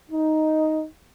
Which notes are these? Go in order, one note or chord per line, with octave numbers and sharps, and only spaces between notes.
D#4